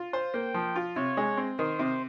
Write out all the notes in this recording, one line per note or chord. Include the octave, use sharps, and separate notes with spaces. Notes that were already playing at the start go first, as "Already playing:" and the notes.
Already playing: F4
C5
A#3 G5
F3
F4
C3 C#5
G#3
C4
D#3 C5
C3